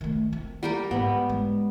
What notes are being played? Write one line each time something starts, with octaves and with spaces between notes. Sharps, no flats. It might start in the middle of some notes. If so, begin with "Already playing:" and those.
D#3 A3
C4
G3 G4 A#4
G#2 B3
G#3